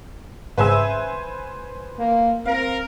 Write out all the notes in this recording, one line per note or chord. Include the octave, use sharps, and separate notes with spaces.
G#1 C#3 B4 C5 E5 G#5
A#3
C4 A#4 F5